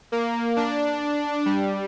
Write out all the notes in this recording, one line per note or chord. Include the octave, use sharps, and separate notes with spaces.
A#3
D4
G3